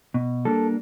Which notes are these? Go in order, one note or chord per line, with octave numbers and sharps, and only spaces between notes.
B2
G3 A#3 D4 A4